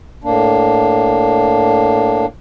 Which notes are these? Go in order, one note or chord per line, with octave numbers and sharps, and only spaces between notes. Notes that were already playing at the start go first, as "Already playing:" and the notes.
A2 A#3 D4